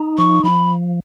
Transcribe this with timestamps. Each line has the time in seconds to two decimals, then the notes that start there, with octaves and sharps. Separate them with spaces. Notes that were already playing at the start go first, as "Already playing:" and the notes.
Already playing: D#4
0.18 F3 C#6
0.44 F3 B5